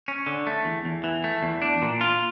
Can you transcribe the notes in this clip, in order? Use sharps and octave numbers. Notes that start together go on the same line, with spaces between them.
C#4
D3
A3
E2
E2
E3
A3
E2
D4
A#2
F4